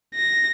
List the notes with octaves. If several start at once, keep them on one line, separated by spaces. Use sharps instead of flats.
A#6